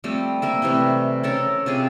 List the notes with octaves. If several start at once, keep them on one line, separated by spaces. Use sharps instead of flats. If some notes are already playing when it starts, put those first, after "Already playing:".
F3 G3 A3 C4
A#3 A#4 E5
C3 E3 G3 A3
C#4 A4 A#4
C3 F4 G#4 D#5